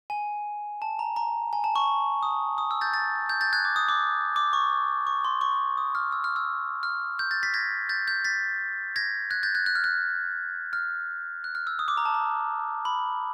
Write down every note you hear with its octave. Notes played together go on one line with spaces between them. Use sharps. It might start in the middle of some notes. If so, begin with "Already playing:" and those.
G#5
A5
A#5
A#5
G#5
A5
C#6
D#6
D#6
E6
G6 A6
G6 A6
G6
G6 A6
F#6 G#6
D6
D#6
D6
D6
C#6
C#6
C6
C#6
D#6
F6
E6
F6
E6
F6
G6
G6 A6
A6 B6
G#6 A#6
G6 A6
G6
A6 B6
G#6 A#6
F#6 G#6
G6 A6
F#6 G#6
F#6
F6
F#6
F6
F#6
F6
E6
D#6
D6
A#5
A5
A#5
B5